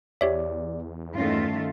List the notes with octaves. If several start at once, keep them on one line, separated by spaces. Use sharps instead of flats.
E2 G4 C#5 D5 E5
G2 D#3 A3 C#4 F4